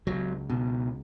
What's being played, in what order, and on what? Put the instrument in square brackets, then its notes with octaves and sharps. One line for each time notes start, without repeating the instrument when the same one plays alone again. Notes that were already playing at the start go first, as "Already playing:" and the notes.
[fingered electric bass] C#2 F#3
B2